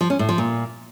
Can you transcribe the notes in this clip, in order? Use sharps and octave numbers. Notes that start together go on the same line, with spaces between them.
F3
C#4
A2
F3
A#2